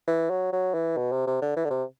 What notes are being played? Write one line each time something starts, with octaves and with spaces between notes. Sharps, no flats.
E3
F#3
F#3
E3
B2
C3
C3
D3
E3
D3
C3